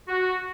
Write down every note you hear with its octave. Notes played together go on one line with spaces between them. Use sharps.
F#4